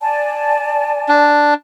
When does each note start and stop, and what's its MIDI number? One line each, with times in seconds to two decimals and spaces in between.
0.01 1.30 74
0.01 1.30 80
0.01 1.30 81
1.09 1.54 62